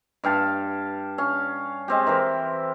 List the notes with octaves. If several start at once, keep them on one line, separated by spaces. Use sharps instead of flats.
G2 F5 G5 A5
C#4 F5
G#3 C4 G4
E3 A#4 C5